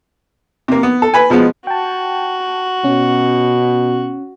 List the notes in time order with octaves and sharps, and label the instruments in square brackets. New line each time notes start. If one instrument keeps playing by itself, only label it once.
[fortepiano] C3 A#3
B3
A4
B4 G#5
B2 F3 G#3 B3
[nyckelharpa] F#4 [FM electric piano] G5 A5
[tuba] B2 [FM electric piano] C#4